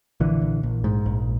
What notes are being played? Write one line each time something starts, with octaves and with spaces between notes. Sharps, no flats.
A#1 D3 E3
A#1
A#1
G#2
A#1